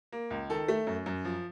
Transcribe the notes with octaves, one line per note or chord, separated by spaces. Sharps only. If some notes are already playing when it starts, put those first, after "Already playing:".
A#3
C#2
D#3 A4
A3
F#2
F#2
F3